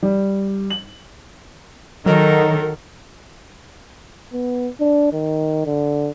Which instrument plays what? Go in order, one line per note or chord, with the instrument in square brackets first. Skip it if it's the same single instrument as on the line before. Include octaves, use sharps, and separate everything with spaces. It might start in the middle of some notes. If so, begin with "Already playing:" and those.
[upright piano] G3
F#7
[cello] D#3 [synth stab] F#3 [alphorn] D#4 [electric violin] A4 A#4
[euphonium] B3
D4
D#3
D3